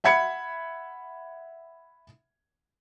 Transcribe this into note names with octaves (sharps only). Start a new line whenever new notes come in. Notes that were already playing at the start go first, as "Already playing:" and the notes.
E5 F#5 B5 G#6 C#7